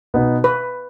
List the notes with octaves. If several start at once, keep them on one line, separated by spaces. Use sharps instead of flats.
B2 B3 D#4 B4
B4